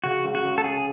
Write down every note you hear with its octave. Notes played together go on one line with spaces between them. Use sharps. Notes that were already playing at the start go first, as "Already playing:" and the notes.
C#3 F#4
C#2
F#4
C#2
A4
G#3 G#4